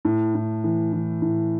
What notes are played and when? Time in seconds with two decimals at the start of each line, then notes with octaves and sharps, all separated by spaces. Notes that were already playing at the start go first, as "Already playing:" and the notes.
0.05 A2
0.35 A2
0.64 E3
0.93 E3
1.22 A2